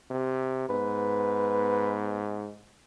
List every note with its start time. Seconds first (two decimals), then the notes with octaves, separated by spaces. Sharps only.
0.10 C3
0.69 G#2 B3 B4